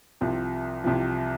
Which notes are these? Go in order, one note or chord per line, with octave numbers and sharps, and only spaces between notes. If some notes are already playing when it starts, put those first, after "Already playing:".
C2 C3 F3
C2 C3 F3